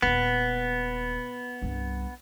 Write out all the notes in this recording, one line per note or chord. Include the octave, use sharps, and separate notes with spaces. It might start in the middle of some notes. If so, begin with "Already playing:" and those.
D#1 B3 E4
C2 G2